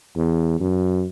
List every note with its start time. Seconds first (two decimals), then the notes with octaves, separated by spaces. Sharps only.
0.16 E2
0.60 F#2